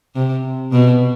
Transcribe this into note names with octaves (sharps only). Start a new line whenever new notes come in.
C3
B2